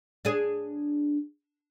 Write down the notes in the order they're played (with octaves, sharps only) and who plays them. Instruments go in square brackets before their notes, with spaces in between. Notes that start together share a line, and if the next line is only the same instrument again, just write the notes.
[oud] D4 G#4